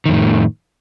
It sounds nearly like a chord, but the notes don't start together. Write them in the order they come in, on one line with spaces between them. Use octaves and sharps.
D#3 F2 A2